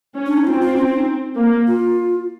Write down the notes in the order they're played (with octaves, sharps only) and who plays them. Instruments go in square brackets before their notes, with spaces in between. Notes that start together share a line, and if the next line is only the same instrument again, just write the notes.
[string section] C#4
[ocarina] D4
D#4
[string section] C4 [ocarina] F4
[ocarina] F4
C#4
C#4
D#4
[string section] A#3
[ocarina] F4